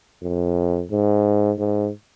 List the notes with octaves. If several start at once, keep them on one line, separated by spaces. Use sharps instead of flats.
F2
G#2
G#2